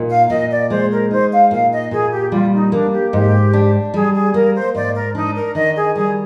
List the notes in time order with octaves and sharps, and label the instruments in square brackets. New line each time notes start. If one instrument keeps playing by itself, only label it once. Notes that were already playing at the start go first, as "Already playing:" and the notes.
Already playing: [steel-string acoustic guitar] A#2 D#4
[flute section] F5
[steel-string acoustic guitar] A#2 [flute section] D#5
[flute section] D5
[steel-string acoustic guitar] G#3 [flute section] C5
[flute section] A#4
[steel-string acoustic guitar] D#4 [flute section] C5
[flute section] F5
[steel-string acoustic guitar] A#2 [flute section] F5
[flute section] D#5
[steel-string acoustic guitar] A#2 [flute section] G#4
[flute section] G4
[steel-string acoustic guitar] G3 [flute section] F4
[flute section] D#4
[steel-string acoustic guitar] A#3 [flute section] D4
[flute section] G4
[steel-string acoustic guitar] G#2 [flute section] G4
[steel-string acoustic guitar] D4
[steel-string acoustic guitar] G3 [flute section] G#4
[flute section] G#4
[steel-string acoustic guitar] A#3 [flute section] A#4
[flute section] C5
[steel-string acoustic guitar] G#2 [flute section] D5
[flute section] A#4
[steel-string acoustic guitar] D4 [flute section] D#4
[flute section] A#4
[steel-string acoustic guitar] D#3 [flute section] D#5
[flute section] G#4
[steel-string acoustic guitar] G3 [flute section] G#4